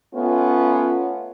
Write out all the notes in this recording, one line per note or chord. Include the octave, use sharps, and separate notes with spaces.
A3 B3 C#4 F4